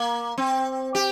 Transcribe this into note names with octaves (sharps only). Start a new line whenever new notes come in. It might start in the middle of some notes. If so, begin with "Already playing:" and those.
Already playing: A#3
C4
G4